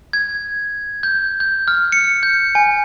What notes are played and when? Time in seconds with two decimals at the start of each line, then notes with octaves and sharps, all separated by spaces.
0.13 G#6
1.03 G6
1.40 G6
1.68 F6
1.92 C#7
2.23 G6
2.55 G#5